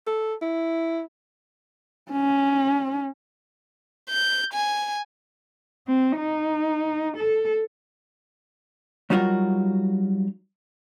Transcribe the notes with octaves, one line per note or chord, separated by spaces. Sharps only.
A4
E4
C#4
G6
G#5
C4
D#4
A4
F#3 G3 D#4 F4 F#4 A#4